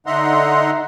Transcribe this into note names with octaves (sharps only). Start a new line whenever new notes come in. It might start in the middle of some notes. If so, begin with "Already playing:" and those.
D3 D#4 E5 F#5 A#5 C6